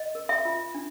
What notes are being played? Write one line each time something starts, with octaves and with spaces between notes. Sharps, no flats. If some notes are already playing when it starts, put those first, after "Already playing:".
Already playing: D#5
A#4
E5
F4
D4